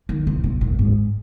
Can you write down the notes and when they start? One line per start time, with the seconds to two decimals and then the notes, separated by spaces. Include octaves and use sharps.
0.09 D#3
0.27 C3
0.44 C3
0.61 A#2
0.79 G#2